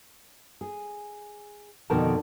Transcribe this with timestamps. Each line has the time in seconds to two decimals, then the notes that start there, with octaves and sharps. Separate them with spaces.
0.61 G#4
1.90 F2 B2 D3 D#3 A#4 A5